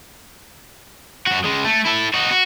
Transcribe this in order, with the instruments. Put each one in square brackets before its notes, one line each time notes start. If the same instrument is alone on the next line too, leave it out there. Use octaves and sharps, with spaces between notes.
[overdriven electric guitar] F#2 F#4
C#3 G#3
A3
E4 A4
D#4 F#4
F#4